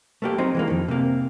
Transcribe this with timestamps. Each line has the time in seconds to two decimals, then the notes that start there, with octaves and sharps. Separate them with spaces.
0.22 A3 A#3 G4
0.38 F#3 C4 D#4
0.55 E3 G#3 A#3
0.68 F2 D#3
0.88 C3 A#3